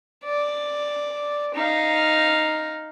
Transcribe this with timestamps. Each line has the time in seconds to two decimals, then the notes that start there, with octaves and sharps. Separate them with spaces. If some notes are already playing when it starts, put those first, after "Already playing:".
0.24 D5
1.54 D#4 F5